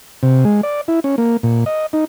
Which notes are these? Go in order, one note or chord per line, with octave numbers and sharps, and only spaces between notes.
C3
G#3
D5
E4
C#4
A#3
A#2
D#5
D#4